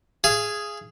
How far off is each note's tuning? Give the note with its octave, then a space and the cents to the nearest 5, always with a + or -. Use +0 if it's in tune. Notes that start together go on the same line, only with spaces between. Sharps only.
G#4 +0 F5 -35